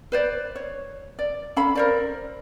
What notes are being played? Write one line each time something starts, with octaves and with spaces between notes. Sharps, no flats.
B4 C5 D5
C#5
D5
C#4 A4 F5 B5
A#4 C5 D5